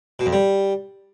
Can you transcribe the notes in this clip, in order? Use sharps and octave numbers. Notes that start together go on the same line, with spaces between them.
B2
F2
G3